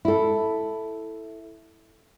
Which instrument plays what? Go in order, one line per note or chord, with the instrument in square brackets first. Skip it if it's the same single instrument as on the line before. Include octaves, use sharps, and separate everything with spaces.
[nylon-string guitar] E4 A4